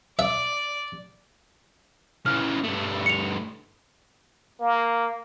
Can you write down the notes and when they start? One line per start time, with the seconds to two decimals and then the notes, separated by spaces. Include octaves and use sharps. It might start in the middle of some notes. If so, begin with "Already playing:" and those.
0.19 D5 E5
2.26 C#3 E3 F6
2.64 G2 A3
3.06 C#7 F7
4.60 A#3